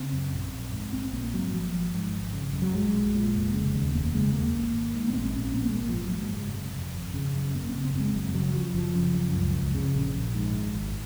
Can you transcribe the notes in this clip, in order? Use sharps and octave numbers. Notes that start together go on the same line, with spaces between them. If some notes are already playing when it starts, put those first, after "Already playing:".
Already playing: C#3 C4
F#2
A#1
A#1
G#2
A#1 C4
A#1 A#3
G#2 F#3
G#1 F3
G#1
G#2
G#1
C#3
F#2
F#3
A#1 G#3
A#1
A#2
F1
C#3
D#2
F1 A#3
C#3 G#3
D#2 A#3
G#1
G#1
G#2
A#3
A#1 C4
A#1 C#4
A#2 A#3
G#3
G#1 A#3
G#1 F3
F#3
G#2 G#3
F#1
C3
F2
G#1
C#3
F#2
G#1 A#3
C#3 C4
C4
F#2
G#3
F#1 F#3
C#3 F#3
F#2 F3
F#1 F3
C#3
F#2
C#2
C#2
C#3
A#1
A#1
G#2
G#1
G#1